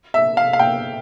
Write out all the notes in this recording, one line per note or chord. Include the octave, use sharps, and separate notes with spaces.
E5
F5
F5
G5